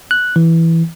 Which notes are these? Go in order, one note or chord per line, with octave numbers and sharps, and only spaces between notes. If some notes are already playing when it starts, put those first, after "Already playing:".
F#6
E3